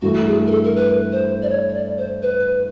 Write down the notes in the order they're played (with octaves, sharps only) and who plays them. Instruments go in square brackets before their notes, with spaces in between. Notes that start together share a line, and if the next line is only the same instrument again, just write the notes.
[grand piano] G2 E3 A3 [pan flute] F#4
[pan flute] G#4
A#4
A4
A#4
B4
C5
D5
C#5
C#5
D5
C5
B4